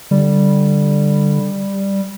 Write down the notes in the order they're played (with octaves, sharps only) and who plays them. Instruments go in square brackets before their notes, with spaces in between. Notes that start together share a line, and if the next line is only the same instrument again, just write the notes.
[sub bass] D3 [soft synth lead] G3